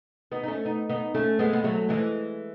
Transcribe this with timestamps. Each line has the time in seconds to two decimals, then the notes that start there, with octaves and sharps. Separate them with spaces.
0.32 B3 D#4
0.43 D#4
0.48 A3 C#4
0.65 B3 D#4
0.89 B3 D#4
1.14 A3 C#4
1.39 G#3 B3
1.53 B3
1.64 F#3 A3
1.89 E3 G#3